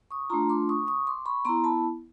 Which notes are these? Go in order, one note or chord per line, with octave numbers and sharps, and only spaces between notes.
C#6 D#6
A3 D4 F4 A#5 C6
C6 D6
C#6 D#6
C#6 D#6
C6 D6
B5 C#6
B3 E4 A#5 C6
A5 B5